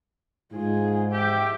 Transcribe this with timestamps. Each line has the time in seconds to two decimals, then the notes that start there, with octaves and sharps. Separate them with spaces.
0.53 G#2 F4 G#4
1.12 G4 E5 G5